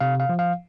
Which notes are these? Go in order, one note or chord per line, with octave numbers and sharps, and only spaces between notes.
C3 F5
F5
F3
F5